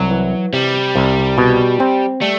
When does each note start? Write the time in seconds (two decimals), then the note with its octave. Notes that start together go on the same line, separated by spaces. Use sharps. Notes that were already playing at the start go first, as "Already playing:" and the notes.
Already playing: C2 F#3
0.11 E3
0.53 C3 G3
0.95 C2
1.38 B2
1.80 C4
2.21 G3 A3